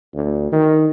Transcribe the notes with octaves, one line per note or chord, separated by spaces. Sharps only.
D2
D#3